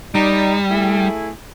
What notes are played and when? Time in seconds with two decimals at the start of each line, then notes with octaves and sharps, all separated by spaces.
0.15 G3 D#4 D5
0.70 A3 E4 G#4